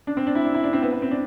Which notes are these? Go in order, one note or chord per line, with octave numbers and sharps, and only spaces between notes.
D4
C4
D4
E4
D4
E4
D4
C4
B3
B3
C4
D4